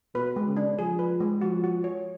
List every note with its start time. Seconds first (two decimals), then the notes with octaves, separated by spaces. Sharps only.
0.14 B2 B4
0.36 G#3
0.47 C#3
0.57 D4
0.78 F3 G#4
0.99 B4
1.20 G#3
1.41 F3 F#4
1.64 F#4
1.84 C#5